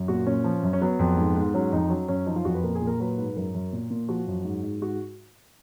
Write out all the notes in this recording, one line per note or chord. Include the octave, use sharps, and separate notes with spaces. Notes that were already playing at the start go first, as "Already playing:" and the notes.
Already playing: F#2
A#2 F#4
A#2 C#4
F3
F#2
C#4
F#3 B3
F2
G#2
G#2
F#3 C#4
F2 D#4
F#3 C#4
F#2 C#4
F3 D#4
F4
F2 F#4
B4
A#2 A#4
G#4
A#2
A#4
F#3 B4
G#2 B4
F#2 A#4
F#2
A#2
A#2
F3 F#4
F#2
G#2
G#2
G#2 F#4